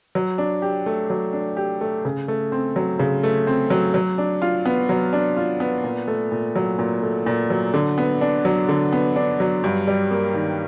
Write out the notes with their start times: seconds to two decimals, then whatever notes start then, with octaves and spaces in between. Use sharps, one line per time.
0.15 F#3
0.38 D4
0.62 G4
0.86 A3
1.10 F#3
1.33 D4
1.57 G4
1.81 A3
2.05 C#3
2.28 A3
2.52 C4
2.76 F#3
2.99 C#3
3.23 A3
3.47 C4
3.70 F#3
3.94 F#3
4.18 D4
4.42 F4
4.65 B3
4.89 F#3
5.13 D4
5.37 F4
5.60 B3
5.84 A#2
6.08 A3
6.32 A#2
6.56 F#3
6.79 A#2
7.03 A3
7.26 A#2
7.50 F#3
7.74 D3
7.98 B3
8.21 D4
8.45 F#3
8.69 D3
8.92 B3
9.16 D4
9.40 F#3
9.64 G2
9.88 G3
10.11 A#3
10.34 D#3